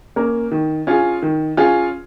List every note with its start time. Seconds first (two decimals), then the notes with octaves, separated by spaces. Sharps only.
0.16 A#3 C#4 A#4
0.51 D#3
0.87 C#4 F4 G#4
1.22 D#3
1.57 C#4 F4 G#4